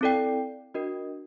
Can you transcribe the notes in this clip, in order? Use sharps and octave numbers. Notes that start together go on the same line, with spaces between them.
C4 E4 A4 D5 G5
D4 F#4 A#4 D#5